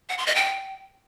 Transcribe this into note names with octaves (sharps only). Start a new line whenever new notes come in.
F#5
C6
D#5
G5